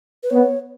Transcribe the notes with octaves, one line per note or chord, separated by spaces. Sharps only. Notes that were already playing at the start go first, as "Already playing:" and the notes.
B4
B3 C#5